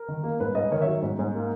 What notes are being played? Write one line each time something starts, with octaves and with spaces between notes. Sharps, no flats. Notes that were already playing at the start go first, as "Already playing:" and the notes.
Already playing: A#4
D#3
A#3
G#2 B4
G#2 B4 D#5
D#3 A#4 C#5
F#3 C#5 E5
G#2
G#2
A#3